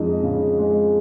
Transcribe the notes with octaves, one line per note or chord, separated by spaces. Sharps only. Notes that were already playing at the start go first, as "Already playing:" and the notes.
Already playing: F2 G#3 D#4 D#5
C#3
G#3